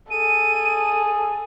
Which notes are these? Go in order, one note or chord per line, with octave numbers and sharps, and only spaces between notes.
G#4 A4 D#7